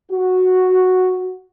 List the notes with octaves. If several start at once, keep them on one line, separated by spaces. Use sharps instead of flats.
F#4